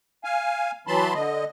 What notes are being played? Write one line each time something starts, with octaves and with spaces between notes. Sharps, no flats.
F5 G#5
E3 F#3 A5 B5 C6
D3 D#5